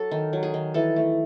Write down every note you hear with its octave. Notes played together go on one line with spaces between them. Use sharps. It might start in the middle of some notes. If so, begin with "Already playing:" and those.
Already playing: F#3 A4
D#3
F#3
G#4
D#3
E3 A4
A3